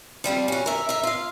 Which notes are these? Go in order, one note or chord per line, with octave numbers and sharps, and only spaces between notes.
F3 G3 C4 F4
C#4 F#4
A#4 E5
A#4 E5
F4 F5